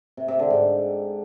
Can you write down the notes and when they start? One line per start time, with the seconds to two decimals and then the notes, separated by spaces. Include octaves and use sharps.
0.17 C3
0.28 C3
0.39 D3
0.50 G#2